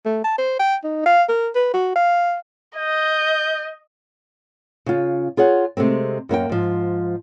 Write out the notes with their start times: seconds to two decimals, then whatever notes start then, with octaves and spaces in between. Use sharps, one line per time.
0.05 A3
0.24 A5
0.38 C5
0.59 G5
0.84 D#4
1.06 F5
1.29 A#4
1.55 B4
1.74 F#4
1.96 F5
2.77 D#5 G6
4.86 C#3 F4
5.37 F4 G#4 C#5 F#5
5.77 C3 G#3 A3 C4
6.29 F#2 A#3 A4 G5
6.49 G#2 F3